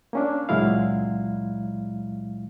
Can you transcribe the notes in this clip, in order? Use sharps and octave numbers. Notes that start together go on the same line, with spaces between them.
A#3 C#4 D4
C#2 A#2 F#3 G#3 E4 F5